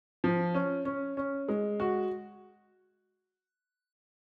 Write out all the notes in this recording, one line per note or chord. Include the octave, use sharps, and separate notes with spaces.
F3
C#4
C#4
C#4
G#3
F#4